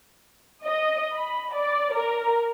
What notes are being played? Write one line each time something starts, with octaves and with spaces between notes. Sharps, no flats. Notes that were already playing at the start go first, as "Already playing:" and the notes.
D#5
B5
D5
A#4